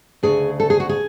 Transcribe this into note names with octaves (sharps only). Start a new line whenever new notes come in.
D2 C#3 G#4
A4
G#4
F#4
G#4